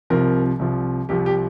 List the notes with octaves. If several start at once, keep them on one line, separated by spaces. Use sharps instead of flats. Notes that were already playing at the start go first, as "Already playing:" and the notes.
C2 C3 F3 A#4
C2 C3 F3
C2 C3 F3 G4
G4